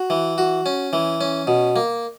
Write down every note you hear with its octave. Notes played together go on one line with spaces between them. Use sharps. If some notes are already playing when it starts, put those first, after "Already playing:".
Already playing: F#4
E3
F#4
C#4
E3
C#4
B2
A#3